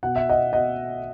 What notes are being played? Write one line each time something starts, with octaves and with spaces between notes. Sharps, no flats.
B2 F#5
E5
D#5 F#5
B2 D#5 F#5